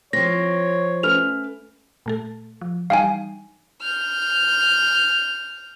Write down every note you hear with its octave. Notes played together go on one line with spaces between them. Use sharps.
F3 C4 C#5 A#6
A3 C#4 B4 F6 F7
A#2 A3 A4
F3
E3 G3 D#4 F5 G5 G#5
F6 G6